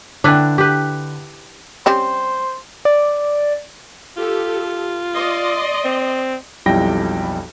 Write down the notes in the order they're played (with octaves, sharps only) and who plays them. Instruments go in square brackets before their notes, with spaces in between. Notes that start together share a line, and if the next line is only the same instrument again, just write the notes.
[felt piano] D3 G5 [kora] D4 E4 B4
[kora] G4 B4
[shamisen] G3 C4 C#4 [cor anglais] C5
[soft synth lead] D5
[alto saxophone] F4 [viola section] G4 A4
[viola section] D5 D#5 C6
[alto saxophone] C4
[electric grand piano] B1 F2 G3 E4 G5 A#6